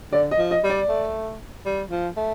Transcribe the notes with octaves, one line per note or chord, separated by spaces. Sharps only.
D3 D5
D#5
F3
D#5
G3
D5
A3
G3
F3
A3